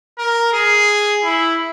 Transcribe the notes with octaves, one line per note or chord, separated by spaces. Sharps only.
A#4
G#4
E4